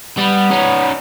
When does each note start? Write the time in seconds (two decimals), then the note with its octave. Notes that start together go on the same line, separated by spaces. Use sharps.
0.18 G3 B3
0.51 C#4 D#4